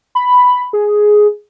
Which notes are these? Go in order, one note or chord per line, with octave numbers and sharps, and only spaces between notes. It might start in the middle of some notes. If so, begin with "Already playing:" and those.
B5
G#4